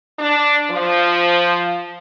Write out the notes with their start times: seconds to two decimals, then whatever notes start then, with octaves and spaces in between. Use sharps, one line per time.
0.19 D4
0.70 F3